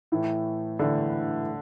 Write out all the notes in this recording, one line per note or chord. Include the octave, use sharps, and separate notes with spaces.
A2 E3 A3
A2 D3 E3 A3